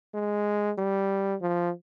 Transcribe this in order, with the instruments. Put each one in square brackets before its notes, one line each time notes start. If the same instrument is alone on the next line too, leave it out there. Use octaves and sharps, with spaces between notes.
[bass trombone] G#3
G3
F3